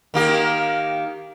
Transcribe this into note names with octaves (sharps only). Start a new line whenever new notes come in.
D#3 A#3 G4